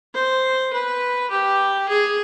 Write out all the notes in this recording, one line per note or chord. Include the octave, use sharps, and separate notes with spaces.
C5
B4
G4
G#4